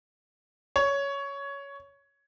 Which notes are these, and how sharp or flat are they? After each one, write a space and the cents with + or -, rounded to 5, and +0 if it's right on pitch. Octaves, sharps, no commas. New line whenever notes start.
C#5 +10